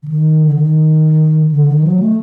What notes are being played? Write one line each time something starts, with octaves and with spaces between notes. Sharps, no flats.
D3
D#3
D3
D#3
D3
D#3
F#3
A3